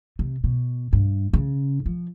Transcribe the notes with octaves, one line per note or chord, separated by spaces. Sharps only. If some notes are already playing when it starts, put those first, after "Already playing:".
C3
B2
G2
C#3
F3